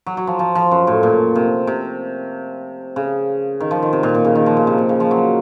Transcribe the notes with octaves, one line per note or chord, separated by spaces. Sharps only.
F#3
F#3
F3
F3
F3
F#2
A2
A#2
C3
C3
C#3
D#3
F3
D#3
C3
A#2
A#2
C#3
D#3
F3
C#3
C3
A#2
C#3
F3
F#3